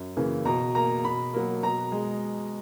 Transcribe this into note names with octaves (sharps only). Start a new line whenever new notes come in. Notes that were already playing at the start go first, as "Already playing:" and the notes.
Already playing: F#2
C#3 E3 A#3
B2 A#5
A#3 A#5
B2 B5
F#3 A#3
B2 A#5
G#3